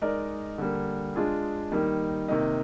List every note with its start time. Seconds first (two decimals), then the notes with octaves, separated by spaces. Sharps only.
0.01 G#3 D#4 A#4 D5
0.58 D3 G3 A#3
1.16 G#3 D4 F4 G#4
1.72 D#3 G3 A#3 D#4
2.28 C3 D#3 A#3 D#4